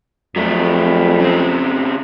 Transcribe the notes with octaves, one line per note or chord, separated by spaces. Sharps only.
F2 F#3 A3
C#3 C4